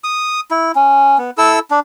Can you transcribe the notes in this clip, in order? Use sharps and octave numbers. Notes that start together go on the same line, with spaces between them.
D#6
E4
C#4
B3
E4 A4 E6
D4